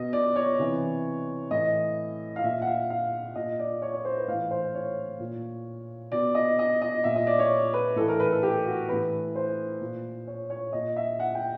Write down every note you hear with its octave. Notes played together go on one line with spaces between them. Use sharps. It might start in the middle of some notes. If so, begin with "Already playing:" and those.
Already playing: B2 D#5
D5
C#5
C3 E3
A2 E3 D#5
F5
A#2 E5
F#5
F5
F5
A#2 D#5
D5
C#5
C#5
C5
B4
A2 E3 F5
C5
C#5
A#2
B2 D5
D#5
D#5
D#5
A#2 E5
D#5
D5
C#5
B4
A2 E3 A4
A#4
B4
A4
G4
F#4
A2 E3 B4
C5
A#2
C#5
C#5
A#2 D#5
E5
F#5
G5